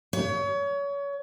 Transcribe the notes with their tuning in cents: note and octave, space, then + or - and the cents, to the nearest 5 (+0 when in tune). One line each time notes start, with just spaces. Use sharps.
C#5 +30